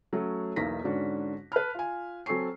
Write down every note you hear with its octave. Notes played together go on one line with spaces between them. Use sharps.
F#3 A3 C#4 F#4
B1 E2 A#3 D#4 A#6 B6
G#2 D3 C#4 D4 F#4
B4 A5 B5 F6
F4 G#5
F#3 C4 A4 G#5 C#6 C7